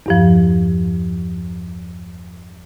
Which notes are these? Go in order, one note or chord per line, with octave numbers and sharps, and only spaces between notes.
E2 G2 F3